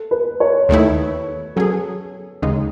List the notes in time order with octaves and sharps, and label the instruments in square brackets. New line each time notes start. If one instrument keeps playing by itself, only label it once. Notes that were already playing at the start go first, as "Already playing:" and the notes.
Already playing: [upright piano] A4
B4
C#5
[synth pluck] D#2 D#3 A3 E4 [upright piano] A4
[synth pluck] F#3 C#4 G#4 [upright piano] A4
[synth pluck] D#2 C#3 G#3 D#4